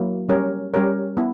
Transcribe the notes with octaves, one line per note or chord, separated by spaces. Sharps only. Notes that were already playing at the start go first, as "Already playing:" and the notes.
Already playing: F#3 A#3 E4
G3 C#4 G4 A#4 C#5
G3 C#4 G4 A#4 C#5
B3 E4